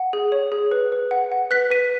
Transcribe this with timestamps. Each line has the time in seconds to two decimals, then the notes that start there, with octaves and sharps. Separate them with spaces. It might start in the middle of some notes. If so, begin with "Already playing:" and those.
Already playing: F#5
0.13 G#4
0.32 C#5
0.52 G#4
0.71 B4
0.92 B4
1.11 F#5
1.32 F#5
1.51 B4 F#6 B6
1.70 B4 B6 D#7